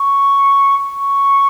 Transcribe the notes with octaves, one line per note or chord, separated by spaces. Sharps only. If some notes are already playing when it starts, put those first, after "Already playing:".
Already playing: C#6
C#6